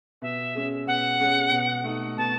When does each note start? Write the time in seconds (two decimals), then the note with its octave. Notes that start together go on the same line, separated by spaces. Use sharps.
0.22 B2 E5
0.55 G#3 C#4
0.87 B2 F#5
1.20 G#3 C#4
1.52 B2
1.84 A3 D#4
2.17 B2 A5